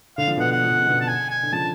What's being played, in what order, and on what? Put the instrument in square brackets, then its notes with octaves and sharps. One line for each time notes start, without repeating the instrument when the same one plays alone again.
[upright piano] D3 [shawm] F5
[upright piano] F3
[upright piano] B2 D3 [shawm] F#5
[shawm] F#5
[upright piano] F3
D3
C#3
B2 D3
[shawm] A5
G#5
G#5
[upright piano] D3
[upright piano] C#3 F3 [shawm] A5